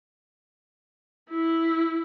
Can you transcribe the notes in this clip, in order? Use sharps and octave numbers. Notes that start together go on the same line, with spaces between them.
E4